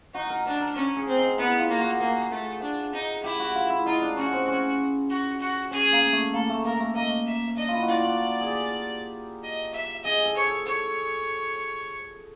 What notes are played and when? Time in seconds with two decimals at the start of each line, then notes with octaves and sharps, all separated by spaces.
0.14 D#4 F#4
0.30 A#4
0.45 D4 A#4
0.61 A#4
0.76 C#4 A#4
0.96 G#4
1.07 C4
1.18 D#4
1.38 B3 E4
1.59 F4
1.69 A#3
1.79 F#4
2.00 A#3 G#4
2.31 A3
2.61 D4
2.93 D#4
3.24 E4 G4
3.39 F#4
3.55 F4
3.70 E4
3.86 D#4 F4
4.01 D4
4.17 C#4 F#4
4.33 C4
4.48 C#4
5.10 F#4
5.40 F#4
5.71 C#4 G#4
5.93 A#3
6.13 A3
6.33 A#3 A4
6.49 A3
6.64 A#3 A#4
6.80 A3
6.95 A#3 D#5
7.27 E5
7.57 D4 D#5
7.68 E4 F4
7.82 F#4
7.88 F4 D5
8.04 F#4
8.41 G#4
8.50 G4
9.44 D#5
9.73 E5
10.05 G#4 D#5
10.25 A4
10.36 C#5
10.46 A4
10.66 A4 C#5